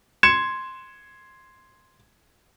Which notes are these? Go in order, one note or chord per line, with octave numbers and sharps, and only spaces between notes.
C6 G#6 C#7 E7